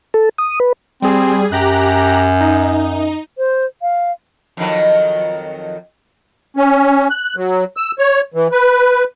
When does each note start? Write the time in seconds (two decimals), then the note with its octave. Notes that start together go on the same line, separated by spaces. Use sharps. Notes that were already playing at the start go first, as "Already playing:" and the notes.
0.14 A4
0.38 D#6
0.60 B4
1.02 G3 C4 G#4
1.52 F#2 G4 A#5 F#6
2.40 D#4
3.38 C5
3.82 F5
4.57 F2 D#3 F#3
6.57 C#4
7.10 F#6
7.36 F#3
7.77 E6
7.99 C#5
8.34 E3
8.52 B4